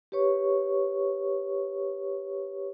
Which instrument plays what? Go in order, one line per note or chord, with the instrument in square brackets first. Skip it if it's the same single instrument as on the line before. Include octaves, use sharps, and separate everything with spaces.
[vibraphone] G4 B4 C#5 C#6